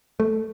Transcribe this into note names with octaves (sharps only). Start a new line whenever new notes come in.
A3